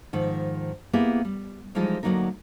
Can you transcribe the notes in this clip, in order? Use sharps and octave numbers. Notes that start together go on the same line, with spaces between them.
G#2 D#3 F3
A#3 B3 E4 G4 G#4
G3
E3 F3 G3 G#3 D#4 F4
D2 G2 F#3 A#3 D#4 A#4